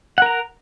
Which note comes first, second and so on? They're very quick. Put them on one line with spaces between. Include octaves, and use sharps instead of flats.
F#5 A#4 A#5